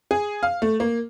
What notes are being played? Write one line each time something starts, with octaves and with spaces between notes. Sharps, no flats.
G#4
F5
A3
A#3